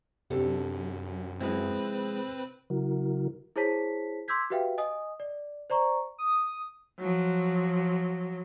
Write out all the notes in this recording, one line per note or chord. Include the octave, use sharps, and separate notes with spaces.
F#2 C3 D4 G4 A4
F3 G#3 C4 E4 B4
C#3 F#3 E4 F#4 A#4
E4 G#4 C5 C#5 A5 B6
C6 D6 E6 G6 G#6 B6
F#4 G4 B4 E5 F5 G5
D#5 G#5 D#6
D5
C5 D5 A#5 C#6
D#6
F3 F#3